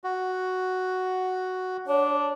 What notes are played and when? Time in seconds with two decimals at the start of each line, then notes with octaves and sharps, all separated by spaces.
0.04 F#4
1.88 D4 C#5